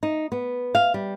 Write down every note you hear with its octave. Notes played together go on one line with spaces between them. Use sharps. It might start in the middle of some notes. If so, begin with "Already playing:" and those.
D#4
B3
F5
G3